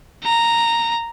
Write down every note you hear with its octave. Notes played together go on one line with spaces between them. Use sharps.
A#5